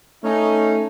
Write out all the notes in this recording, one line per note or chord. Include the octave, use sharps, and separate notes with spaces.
A3 C#4 D#4